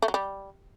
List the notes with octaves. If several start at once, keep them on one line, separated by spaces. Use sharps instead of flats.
A3
F#3
G3